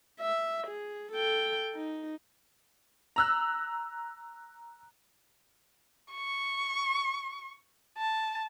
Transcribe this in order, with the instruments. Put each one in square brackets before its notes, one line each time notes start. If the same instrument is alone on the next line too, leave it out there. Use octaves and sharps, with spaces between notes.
[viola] E5
G#4
A4 G5
D#4
[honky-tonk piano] A#5 E6 F#6
[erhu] C#6
A5